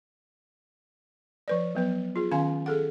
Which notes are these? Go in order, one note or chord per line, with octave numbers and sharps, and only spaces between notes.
F3 B4 D5
F#3 B3 B4
F4 G#4
D#3 C#4 F5 G#5 C6
G#4 A4 F#5